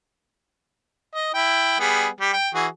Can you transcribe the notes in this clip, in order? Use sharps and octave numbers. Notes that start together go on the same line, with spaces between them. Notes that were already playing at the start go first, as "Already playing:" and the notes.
D#5
E4 G5
G3 B3 G#4
G3 G4
G5
E3 F#4 G#4